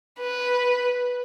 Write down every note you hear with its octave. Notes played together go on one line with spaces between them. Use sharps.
B4